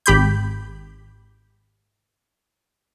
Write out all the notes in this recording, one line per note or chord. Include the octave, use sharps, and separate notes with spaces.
G#1 G4 B5 G6